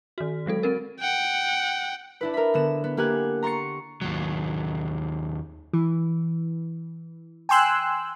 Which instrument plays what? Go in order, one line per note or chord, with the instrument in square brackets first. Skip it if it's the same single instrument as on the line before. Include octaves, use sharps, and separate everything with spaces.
[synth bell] D#3 F#4
D3 F#3 G#3 A4
C4 A#4
[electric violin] F#5 G5
[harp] D4 E4 B4
A#4 B5
D3 B3 E7
B3
A#3 G4 F#5 G#5 F#6
A#5 C6 C#6 A6 C#7
[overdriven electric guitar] D#2 F#3
[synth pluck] E3
G5 G#5 C6 E6 F#6